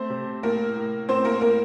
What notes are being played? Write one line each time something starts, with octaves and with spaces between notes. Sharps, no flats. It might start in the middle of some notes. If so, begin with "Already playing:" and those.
Already playing: A3 C4 C5
C3
A2 A#3 A#4
A2
A2 C4 C5
A#3 A#4
A2 A#3 A#4